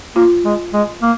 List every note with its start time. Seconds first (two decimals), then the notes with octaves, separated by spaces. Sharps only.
0.15 A#3 F4
0.45 G#3
0.73 G#3
1.02 A#3